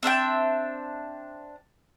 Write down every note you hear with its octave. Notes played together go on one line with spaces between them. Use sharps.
C4 D4 E5 G5